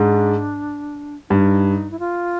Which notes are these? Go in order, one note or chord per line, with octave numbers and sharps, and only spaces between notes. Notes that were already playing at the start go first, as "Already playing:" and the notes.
Already playing: G#2 D4
G2 D#4
E4
F4